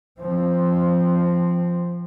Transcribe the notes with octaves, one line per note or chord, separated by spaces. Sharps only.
F3 C4